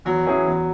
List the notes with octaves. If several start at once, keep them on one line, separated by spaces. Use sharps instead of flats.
E2 F#3
E3 C#4 E4 G#4
E2